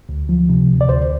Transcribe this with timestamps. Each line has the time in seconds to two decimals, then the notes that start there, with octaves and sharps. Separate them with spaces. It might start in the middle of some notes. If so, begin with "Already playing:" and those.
0.09 D2
0.29 F3
0.49 C3
0.68 D2
0.81 D5
0.88 D2 C5